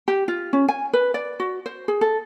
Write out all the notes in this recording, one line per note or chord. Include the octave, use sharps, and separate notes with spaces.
G4
F4
C#4
G#5
B4
D5
F#4
C5
G#4
A4